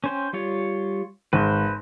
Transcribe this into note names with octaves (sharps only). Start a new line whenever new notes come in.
C#4 C5 G5
G3 F4 C#5
G#1 B4 C5